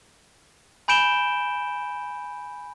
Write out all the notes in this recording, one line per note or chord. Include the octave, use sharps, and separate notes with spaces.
G#5 B5 G6 D7 E7 G7